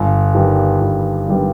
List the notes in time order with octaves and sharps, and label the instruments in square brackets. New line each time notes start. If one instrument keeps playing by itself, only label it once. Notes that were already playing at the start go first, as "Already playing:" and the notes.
Already playing: [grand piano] G1
G2 D#3 G3 B3
G1
G2 D#3 G3 B3